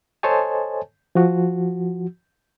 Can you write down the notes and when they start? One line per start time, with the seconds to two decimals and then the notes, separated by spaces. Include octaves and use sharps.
0.23 A4 C5 C#5 D#5 G#5 A5
1.15 F3 F#4